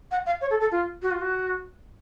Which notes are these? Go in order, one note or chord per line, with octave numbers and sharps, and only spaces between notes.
F#5
F5
C#5
A4
A4
F4
F#4
F4
F#4